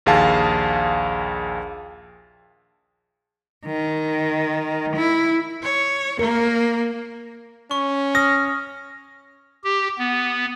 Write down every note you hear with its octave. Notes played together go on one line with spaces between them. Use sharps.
A#1 D#2 G#4 F5 A5
D#3
E4
C#5
A#3 A#4
C#4 C#6
D#6 F6 A#6
G4
B3